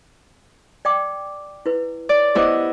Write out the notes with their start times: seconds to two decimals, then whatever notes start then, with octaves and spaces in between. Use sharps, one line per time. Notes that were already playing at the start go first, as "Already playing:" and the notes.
0.85 D5 G5 D6
1.66 E4 B4
2.09 D5
2.35 B3 E4 G4 C5 D#5 D6